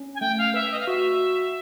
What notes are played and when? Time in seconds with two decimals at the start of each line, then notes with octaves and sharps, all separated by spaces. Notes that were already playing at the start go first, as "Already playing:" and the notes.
Already playing: C#4
0.15 G#5
0.20 A3 G5
0.38 F5
0.54 B4 E5
0.71 D#5
0.80 F5
0.87 F#4 E5